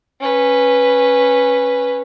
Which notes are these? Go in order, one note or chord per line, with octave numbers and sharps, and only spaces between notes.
C#4 B4